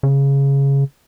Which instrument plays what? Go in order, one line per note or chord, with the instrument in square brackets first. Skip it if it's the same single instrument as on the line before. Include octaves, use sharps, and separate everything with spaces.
[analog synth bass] C#3